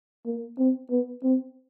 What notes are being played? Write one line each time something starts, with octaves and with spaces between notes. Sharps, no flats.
A#3
C4
B3
C4